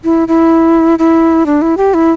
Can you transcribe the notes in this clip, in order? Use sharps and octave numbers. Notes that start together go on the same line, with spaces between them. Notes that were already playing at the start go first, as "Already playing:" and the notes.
E4
E4
E4
D4
E4
G4
E4